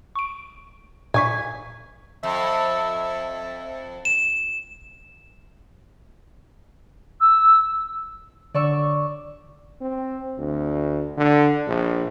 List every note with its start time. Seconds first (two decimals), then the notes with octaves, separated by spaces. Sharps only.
0.15 C#6 D7
1.14 A#2 G#5 C#6 B6
2.23 F2 E5
4.05 E7
7.20 E6
8.54 D3 D5 C#6 E6
9.81 C4
10.38 D2
11.18 D3
11.68 A#1